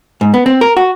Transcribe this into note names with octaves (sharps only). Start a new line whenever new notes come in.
G#2
B3
C4
A#4
F#4